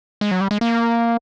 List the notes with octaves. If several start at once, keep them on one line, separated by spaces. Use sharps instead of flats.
G#3
F#3
G3
G#3
A#3